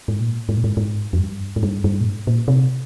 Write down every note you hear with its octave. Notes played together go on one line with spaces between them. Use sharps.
G#2
A#2
G#2
A#2
G#2
G#2
F2
G2
G#2
G2
G2
A#2
G#2
A#2
C3